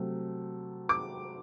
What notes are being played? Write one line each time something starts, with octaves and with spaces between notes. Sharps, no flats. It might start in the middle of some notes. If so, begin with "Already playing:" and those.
Already playing: C3 F#3 A3
D6